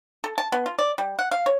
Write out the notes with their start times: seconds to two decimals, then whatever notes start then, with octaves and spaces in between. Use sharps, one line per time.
0.24 A4
0.38 A5
0.52 B3
0.66 F4
0.79 D5
0.98 G3
1.19 F#5
1.31 F5
1.46 C#5